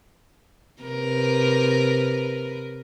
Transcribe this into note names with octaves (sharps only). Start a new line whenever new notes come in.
C3 A#4 B4